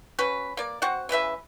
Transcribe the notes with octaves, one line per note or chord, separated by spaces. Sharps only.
C#4 F#4 B4
A#3 D5
C4 F#4 F#5
C#3 E3 B4 E5